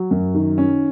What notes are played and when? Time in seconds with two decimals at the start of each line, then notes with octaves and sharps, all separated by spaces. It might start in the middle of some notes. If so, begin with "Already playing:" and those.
Already playing: F#3
0.11 F#2
0.34 D#3
0.58 C#4